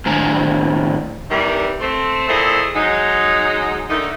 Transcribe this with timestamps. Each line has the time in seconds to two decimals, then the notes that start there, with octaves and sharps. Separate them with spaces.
0.06 A2 D#3 D4 C5 G#5 A#5
1.31 C3 D#3 E3 G3
1.81 A3 C4
2.29 A#2 A3 C4 E4 G#4 D#5
2.76 F#3 G#3 D#4
3.89 D3 D#3 A3 D#4